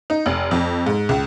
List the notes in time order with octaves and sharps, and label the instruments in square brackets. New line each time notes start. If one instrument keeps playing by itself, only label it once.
[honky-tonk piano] D#4
F1
F2
G#2
C#2